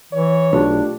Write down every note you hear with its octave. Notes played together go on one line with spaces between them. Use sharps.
E3 C#5
B1 A3 D4 F4 G4